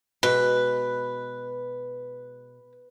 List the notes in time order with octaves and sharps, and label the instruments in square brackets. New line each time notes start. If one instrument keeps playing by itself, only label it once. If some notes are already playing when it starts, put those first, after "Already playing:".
[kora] B2 G#3 [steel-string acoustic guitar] B4